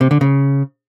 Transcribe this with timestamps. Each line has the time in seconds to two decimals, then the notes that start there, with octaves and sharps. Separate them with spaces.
0.01 C3
0.11 D3
0.21 C#3